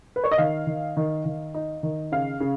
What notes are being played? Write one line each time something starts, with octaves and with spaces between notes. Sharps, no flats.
B4
C#5
D#5
D#3 F5
D#3
D#3
D#3
D#4
D#3
C#3 F5
C#3